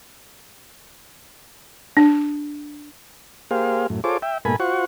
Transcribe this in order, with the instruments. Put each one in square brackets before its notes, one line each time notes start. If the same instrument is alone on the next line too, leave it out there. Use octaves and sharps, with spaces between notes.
[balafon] D4
[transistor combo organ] A#3 G4 G#4 C5 F5
F#2 A2
F4 G#4 A4 C5 C#5 D6
E5 G5
G#2 B2 A#3 A4 G#5 B5
F4 F#4 C5 F#5 C#6